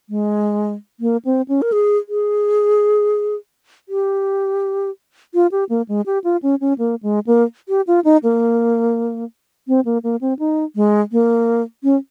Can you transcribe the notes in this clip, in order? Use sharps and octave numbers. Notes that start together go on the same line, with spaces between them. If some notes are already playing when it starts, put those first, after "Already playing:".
G#3
A#3
C4
C#4
A#4
G#4
G#4
G4
F4
G4
A#3
G#3
G4
F4
C#4
C#4
A#3
G#3
A#3
G4
F4
D#4
A#3
C4
A#3
A#3
C4
D#4
G#3
A#3
C#4